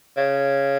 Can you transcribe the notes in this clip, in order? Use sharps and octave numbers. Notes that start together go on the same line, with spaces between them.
C#3